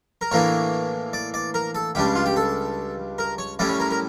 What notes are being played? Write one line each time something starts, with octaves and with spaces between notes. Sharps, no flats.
A#4
A2 E3 A#3 D4 C#5
D5
D5
A#4
A4
C#2 C#3 G3 D4 G4
F4
G4
A4
A#4
C#5
A2 G3 C#4 E4 D5
C#5
A#4
A#4